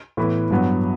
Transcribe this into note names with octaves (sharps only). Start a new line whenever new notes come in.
A2 E3 B3 E4 B4
G2 F#3 B3